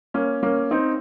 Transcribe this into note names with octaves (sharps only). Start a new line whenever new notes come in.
A#3 C#4
A#3 C#4
C4 D#4